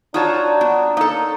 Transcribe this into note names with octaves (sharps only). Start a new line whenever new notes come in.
D4 D#4 F4 F#4 C#5 A5
B3
A#3 D#4 A4